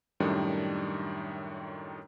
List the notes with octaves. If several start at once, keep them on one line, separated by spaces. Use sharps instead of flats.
F#2 A2 D#3 G3 D4